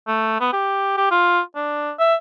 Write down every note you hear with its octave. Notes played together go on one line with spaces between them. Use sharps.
A3
B3
G4
G4
F4
D4
E5